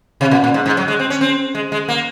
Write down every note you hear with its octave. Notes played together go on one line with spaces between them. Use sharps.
C3
A#2
A#2
G#2
G#2
F#3
G#3
C4
C#4
C4
G#3
G#3
A#3